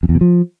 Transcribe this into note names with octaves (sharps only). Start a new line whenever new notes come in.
F2
E2
B2
F3